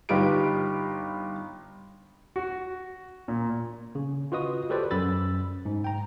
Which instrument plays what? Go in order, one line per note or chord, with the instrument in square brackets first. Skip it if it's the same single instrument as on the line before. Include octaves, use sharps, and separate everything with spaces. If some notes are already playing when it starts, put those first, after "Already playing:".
[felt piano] G1 D#4 F4 G4 B4 D7
[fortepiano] F#4
A#2
[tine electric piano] C#3
F4 F#4 B4 D#5 D#6
F#4 G4 A4 B4 C5 D5
F#2 B5 E6 A6
G#2
G5 A#5